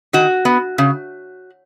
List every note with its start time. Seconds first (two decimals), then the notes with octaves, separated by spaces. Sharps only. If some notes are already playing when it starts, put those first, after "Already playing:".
0.13 D#3 F#4
0.45 B3
0.78 C#3